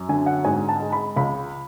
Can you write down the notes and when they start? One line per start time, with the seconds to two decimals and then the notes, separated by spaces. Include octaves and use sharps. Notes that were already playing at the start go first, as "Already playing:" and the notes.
Already playing: F#2
0.09 D3 G#5
0.26 F#5
0.45 G#2 G#5
0.69 A5
0.80 G#3
0.93 B5
1.16 C#2 B5